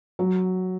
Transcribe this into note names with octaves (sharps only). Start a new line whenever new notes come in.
F#3